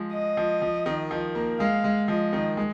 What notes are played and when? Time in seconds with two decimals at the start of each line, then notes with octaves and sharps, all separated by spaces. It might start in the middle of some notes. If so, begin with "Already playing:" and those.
Already playing: F3 G#3
0.13 D#5
0.37 F3
0.62 F3
0.86 D#3
1.11 F3
1.35 A#3
1.60 G#3 F5
1.84 G#3
2.08 F3 D#5
2.33 D#3
2.57 G#3